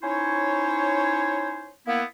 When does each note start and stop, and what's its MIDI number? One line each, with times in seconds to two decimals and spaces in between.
0.03 1.70 61
0.03 1.70 63
0.03 1.70 64
0.03 1.70 72
0.03 1.70 73
1.87 2.02 58
1.87 2.02 59
1.87 2.02 64